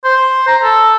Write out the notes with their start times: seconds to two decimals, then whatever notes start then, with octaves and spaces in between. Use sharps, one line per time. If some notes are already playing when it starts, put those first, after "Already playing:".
0.04 C5
0.47 A#5
0.63 A4